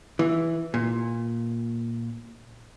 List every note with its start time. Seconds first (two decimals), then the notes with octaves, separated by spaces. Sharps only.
0.19 E3
0.74 A#2